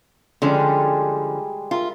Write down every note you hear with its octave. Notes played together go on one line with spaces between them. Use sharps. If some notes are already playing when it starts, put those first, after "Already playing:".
D3 F3 G3 G#3 C#4
F4 A#4 E5